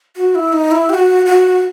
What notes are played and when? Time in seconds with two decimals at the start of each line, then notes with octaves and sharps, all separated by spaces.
0.17 F#4
0.35 E4
0.53 D#4
0.71 E4
0.89 G4
0.94 F#4
1.26 F#4